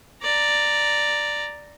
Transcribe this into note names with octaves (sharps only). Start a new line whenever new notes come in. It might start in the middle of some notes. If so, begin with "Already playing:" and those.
D5 A#5